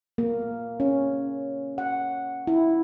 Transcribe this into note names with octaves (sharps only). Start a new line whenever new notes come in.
A#3
C#4
F#5
E4